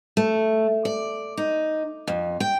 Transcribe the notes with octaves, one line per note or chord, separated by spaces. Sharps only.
A3
D5
D#4
F2
G5